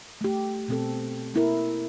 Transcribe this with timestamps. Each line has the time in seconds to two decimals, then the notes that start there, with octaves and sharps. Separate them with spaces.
0.21 A3 G4
0.68 B2 C4 A4
1.34 A#3 E4 A#4